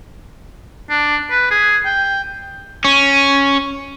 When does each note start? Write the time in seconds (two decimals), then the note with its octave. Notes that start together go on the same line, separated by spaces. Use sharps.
0.90 D4
1.31 B4
1.51 G#4
1.86 G5
2.85 C#4